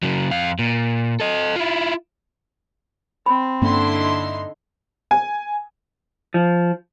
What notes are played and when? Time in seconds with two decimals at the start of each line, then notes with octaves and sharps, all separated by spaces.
0.03 C#3 F#3
0.31 F2 F5
0.59 A#2
1.20 A4 D#5
1.56 E4 F4
3.26 C4 B5
3.62 G2 D3 A#3 C#4 E4 C6
3.93 D#4
5.11 G#5
6.34 F3